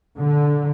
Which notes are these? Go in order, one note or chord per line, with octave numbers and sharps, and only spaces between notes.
D3